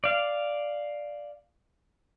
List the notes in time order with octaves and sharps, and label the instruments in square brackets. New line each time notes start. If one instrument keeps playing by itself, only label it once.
[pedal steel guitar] D5 F5